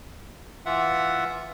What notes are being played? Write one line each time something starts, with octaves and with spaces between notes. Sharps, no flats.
E3 F4 E5 F#5